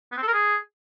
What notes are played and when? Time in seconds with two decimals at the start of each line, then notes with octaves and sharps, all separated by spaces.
0.12 B3
0.17 C4
0.23 A4
0.28 A#4
0.33 G#4